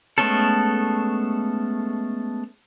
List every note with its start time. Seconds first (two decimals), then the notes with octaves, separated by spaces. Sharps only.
0.18 G#3 A3 B3 C#4 A4